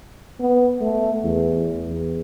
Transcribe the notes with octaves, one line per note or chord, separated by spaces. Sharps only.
B3
A3
E2
E2